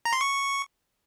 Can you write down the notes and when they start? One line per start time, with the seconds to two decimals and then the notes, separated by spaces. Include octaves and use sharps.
0.05 A#5
0.13 C6
0.21 C#6